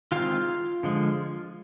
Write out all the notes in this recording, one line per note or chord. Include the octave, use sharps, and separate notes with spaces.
D#3 G#3 C4 F4 F5
D3 F3 G#3